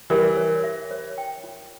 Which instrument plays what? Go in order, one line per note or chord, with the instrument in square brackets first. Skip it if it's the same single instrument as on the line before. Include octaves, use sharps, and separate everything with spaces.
[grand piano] E3 G3 [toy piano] A#4
[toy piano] C#5
E5
C#5
G5
F4